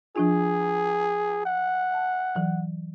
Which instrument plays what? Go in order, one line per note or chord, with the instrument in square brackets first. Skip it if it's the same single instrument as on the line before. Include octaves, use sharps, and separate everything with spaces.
[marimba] F3 D4 F4 [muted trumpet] G#4
[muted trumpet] F#5
[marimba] A5
E3 F#3